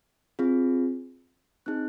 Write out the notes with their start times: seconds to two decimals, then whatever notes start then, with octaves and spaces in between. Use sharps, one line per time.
0.39 C4 F4 G#4
1.66 C4 D#4 G#4 F#6